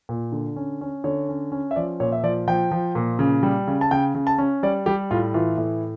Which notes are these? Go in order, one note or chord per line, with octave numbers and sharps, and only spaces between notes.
A#2
D3
C#4
C#4
D3 C#5
C#4
C#4
E5
F3 D5
A#2 C#5
E5
F3 D5
F3 G5
F3
A#2
C#3
G3
C#3
A5
C#3 G5
C#3
A5
C#4
G3 D5
G3 G4
A2 F4
E3 F4
A2